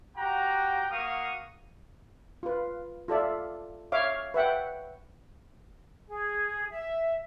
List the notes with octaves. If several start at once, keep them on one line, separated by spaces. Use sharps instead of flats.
F#4 G4 F#5 G5 A#5
A#3 F#4 A#4 F5 C#6 D#6
F4 B4
F4 A4 D5 E5
C#5 E5 F5 D6
B4 E5 F#5 G5
G#4
E5